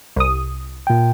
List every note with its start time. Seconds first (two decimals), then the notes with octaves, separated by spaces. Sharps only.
0.16 C2 D#6
0.87 A#2 G5